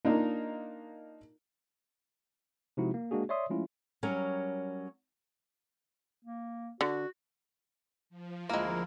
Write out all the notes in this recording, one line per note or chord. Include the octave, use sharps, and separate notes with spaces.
A#3 D4 D#4 F4 A#4
C3 F3 G#3 D#4 E4 F#4
A#3
G#3 A#3 D4 F#4 G#4
C#5 D5 E5 C6 D#6
F3 G#3 A3 C#4 E4 F4
F#3 G3 C#4 A#4 C#5
A#3
D3 F#4
F3
D2 G#3 A#3 E4 A#4